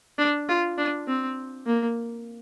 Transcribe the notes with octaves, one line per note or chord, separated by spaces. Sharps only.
D4
F4
D4
C4
A#3